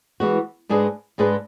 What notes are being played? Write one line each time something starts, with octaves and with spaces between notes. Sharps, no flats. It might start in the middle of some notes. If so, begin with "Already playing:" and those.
E3 G#3 B3 F#4
G#2 G#3 D4 G#4 B4
G#2 G#3 D4 G#4 B4